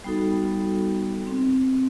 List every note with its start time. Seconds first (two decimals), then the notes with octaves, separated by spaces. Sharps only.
0.04 G3 B3 D#4 F#4 A4
1.27 C4